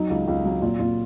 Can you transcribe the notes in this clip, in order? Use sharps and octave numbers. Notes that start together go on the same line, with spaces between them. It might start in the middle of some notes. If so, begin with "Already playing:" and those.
Already playing: F#3 D#4
C#2
C#2
F#3
A#2 F4
A#2 F4